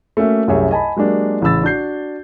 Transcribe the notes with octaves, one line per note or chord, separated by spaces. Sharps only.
A3 A#3 C#4 F#4 E5
C2 F#2 G4 G#4 C#5 E5
D#5 G#5 A5 B5
F#3 G#3 A#3 D4 G4
A1 C#3 B5 E6 A6
D4 F#4 G6 C7